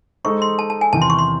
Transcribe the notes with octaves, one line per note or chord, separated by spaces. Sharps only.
G#3 D#4 A4 C5 C#6
C6
A5
A5
G#5
E2 C3 D#3 A5
C6
C#6
C6